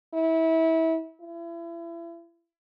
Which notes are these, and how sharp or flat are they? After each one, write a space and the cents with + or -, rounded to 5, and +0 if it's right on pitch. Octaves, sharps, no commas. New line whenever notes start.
E4 -25
E4 +35